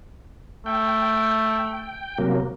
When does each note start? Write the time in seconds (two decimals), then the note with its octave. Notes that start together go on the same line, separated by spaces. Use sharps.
0.66 A3 G5
2.18 C3 F#3 A#3